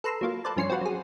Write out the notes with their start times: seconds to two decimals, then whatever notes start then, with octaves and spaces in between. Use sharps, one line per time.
0.04 A4 B4 A#5 C6 E6
0.21 F#3 A#3 F4
0.44 A4 B4 C5 D5 A5
0.57 G2 F3 C#4 C6 C#6 C7
0.70 C4 F4 F#4 B4
0.81 F#3 G#4